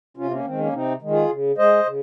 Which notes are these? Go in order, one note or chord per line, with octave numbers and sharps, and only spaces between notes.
C3 C#4 F4
A#3 C#4
D#3 G#3 C4
A#3 C#4
C3 C4 D#4
D#3 G#3
F4 G#4
C#3
G#3 C5 D#5
C#3